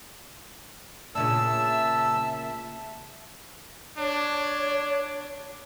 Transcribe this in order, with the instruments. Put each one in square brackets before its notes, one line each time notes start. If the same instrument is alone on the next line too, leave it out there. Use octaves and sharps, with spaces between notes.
[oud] A#2 C#3 D4 [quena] E5 [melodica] A5 [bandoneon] E6
[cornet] D4 [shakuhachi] C#5